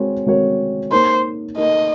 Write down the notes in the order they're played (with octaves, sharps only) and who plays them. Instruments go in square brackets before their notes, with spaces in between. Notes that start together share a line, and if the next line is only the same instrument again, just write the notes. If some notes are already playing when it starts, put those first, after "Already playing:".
Already playing: [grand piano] G#3 C4 F#4 A#4 C#5
G#3 C4 F#4 A#4 C#5
[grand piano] A#3 D#4 A#4 [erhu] C5
[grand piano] A#3 D#4 A#4 [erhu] D#5